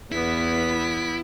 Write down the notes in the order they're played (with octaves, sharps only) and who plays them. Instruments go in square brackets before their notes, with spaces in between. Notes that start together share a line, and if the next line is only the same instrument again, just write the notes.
[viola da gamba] E2 [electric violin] B3 B6 [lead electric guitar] E4